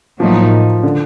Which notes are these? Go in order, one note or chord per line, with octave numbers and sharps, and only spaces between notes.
A2 F3 F#3 A#3 D#4
D3